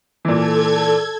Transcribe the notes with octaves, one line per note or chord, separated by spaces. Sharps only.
A#2 E3 A4 G#6